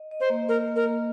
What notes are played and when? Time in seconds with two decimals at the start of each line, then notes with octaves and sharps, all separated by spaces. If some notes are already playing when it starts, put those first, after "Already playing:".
Already playing: D#5
0.11 D#5
0.21 C5
0.30 A#3
0.49 A#3 A#4
0.67 A#3
0.76 A#4
0.85 A#3